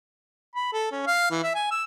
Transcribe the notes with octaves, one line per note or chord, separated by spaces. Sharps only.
B5
A4
C#4
F5
E3
E5
G#5
E6